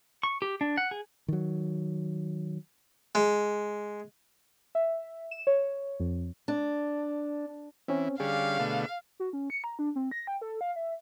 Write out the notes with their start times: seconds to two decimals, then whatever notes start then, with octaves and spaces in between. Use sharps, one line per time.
0.23 C#6
0.42 G4
0.61 D4
0.78 F#5
0.91 G#4
1.28 D#3 F#3
3.15 G#3
4.75 E5
5.31 E7
5.47 C#5
6.00 F2
6.48 D4
7.88 E3 C4 C#4
8.20 D3 G3 C#4 G#4 F5
8.59 B2 D3 A3
9.20 F#4
9.33 C#4
9.50 C#7
9.64 A#5
9.79 D4
9.96 C4
10.11 A#6
10.27 G5
10.42 A4
10.61 F5
10.76 E5